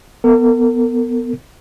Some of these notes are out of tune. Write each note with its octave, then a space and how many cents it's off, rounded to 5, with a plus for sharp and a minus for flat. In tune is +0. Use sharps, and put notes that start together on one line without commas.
B3 +0 A#4 -45